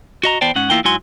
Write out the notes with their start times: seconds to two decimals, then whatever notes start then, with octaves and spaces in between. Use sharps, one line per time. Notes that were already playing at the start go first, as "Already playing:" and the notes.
0.23 F#4 D#5 A#5
0.41 E2 B3 C5 D5 G5 A5
0.55 G#2 C#4 F#5
0.70 E2 A#3 E4 F4 A#4 G5
0.84 G#2 F#3 E4 F#4 G#5 C6